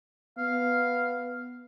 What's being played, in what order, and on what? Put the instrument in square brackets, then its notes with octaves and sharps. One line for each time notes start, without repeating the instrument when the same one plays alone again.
[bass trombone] B3 [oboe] F5